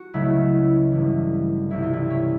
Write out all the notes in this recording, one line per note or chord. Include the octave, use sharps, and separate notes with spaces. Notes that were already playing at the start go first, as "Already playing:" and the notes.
Already playing: F#4
C#2 C#3 F#3 A3 E4
G1 G2 E3
C2 C3 E3 E4
F4
E4
C#4